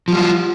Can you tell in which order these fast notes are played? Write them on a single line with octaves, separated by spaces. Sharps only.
F3 G3 F4